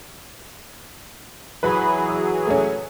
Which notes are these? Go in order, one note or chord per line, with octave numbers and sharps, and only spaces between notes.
E3 F#3 G#4 B4 B5
E6
A3 C#4